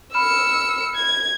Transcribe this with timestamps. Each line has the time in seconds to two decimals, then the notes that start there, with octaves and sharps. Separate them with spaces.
0.14 B5 E6 F6 C#7 E7
0.95 G#6